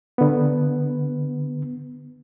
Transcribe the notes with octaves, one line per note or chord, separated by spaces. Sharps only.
D3 B3